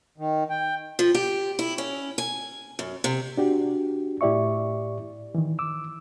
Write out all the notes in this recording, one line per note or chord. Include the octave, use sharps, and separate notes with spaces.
D#3
G5
F3
G4
E4
C#4
G#5
F#2
C3
D4 F#4 G4
A2 E4 G4 D5 E5 C#6
D#3 E3
D6 E6